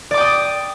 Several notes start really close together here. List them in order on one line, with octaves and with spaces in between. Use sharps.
D5 D6 G5 D#6